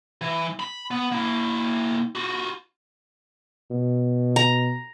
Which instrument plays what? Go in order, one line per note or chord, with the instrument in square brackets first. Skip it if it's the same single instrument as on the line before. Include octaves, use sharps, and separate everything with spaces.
[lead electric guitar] E3
B5
B3
A#3 E4
F4 F#4
[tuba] B2
[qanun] A#5